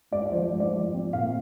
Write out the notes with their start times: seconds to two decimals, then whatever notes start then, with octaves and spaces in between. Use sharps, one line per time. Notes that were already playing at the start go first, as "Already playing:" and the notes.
0.12 G#2 D5
0.26 D5
0.32 F3 C5
0.52 G#2
0.60 D5
0.74 F3
0.94 C4
1.13 A#2 F5